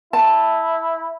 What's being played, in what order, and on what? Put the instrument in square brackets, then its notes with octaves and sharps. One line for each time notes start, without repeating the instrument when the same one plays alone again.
[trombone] E4 [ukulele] A5